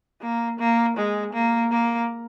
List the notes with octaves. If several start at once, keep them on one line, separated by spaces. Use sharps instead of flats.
A#3
A#3
G#3
A#3
A#3